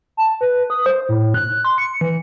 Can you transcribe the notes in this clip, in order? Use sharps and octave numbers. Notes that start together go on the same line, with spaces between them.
A5
B4
D#6
C5
A2
F#6
C6
C#7
E3